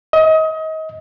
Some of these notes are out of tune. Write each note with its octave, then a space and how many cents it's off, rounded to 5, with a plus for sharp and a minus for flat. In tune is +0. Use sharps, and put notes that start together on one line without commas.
D#5 +30